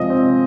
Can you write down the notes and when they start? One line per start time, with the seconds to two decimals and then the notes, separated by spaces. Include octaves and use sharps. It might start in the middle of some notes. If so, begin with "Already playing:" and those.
Already playing: C3 F3 G#3 D#5
0.10 C4